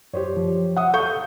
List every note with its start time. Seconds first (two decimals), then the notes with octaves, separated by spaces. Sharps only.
0.14 F#2 G4 C5 C#5
0.37 F3
0.77 E5 F#5 D#6
0.94 A4 F5 C#6 G6